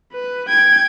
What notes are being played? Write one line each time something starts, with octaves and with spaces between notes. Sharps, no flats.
B4
G5 G#6